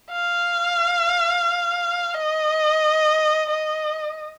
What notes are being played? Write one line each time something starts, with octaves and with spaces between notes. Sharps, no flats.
F5
D#5
D#5